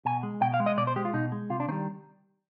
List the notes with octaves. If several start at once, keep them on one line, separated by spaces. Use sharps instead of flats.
B2 G#5
G#3
B2 G5
F5
G#3
D#5
B2 D5
C5
G#3 G4
F4
B2 D#4
G#3
C3 F4
D4
D#3 G3 C4